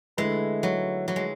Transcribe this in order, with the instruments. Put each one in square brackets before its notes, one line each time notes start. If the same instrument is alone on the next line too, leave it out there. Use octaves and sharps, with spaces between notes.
[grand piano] D3 A3 E4 B4 E5 [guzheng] G#3
[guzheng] F#3
F#3
G#3